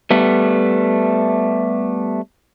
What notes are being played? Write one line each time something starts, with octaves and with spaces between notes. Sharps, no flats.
G3 A3 B3